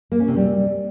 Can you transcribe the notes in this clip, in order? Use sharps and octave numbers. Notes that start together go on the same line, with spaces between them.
A#3
C#4
C3
G3